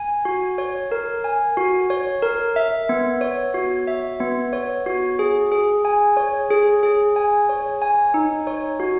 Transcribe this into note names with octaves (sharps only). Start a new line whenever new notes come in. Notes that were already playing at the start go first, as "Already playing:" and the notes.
Already playing: G#5
F#4
C#5
A#4
G#5
F#4
C#5
A#4
E5
B3
C#5
F#4
E5
B3
C#5
F#4
G#4
G#4
G#5
C#5
G#4
G#4
G#5
C#5
G#5
D#4
C#5
F#4